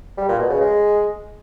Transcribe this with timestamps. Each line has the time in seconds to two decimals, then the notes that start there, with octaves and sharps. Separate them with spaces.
0.18 G3
0.28 A#2
0.39 B2
0.50 C#3
0.61 G#3